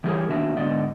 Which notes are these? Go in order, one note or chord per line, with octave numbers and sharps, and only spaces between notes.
E3 G3 G4 G#4 A#4 C#5
B2 D#3 A#3 D4 F#4 E5
G#2 D3 B3 D5 D#5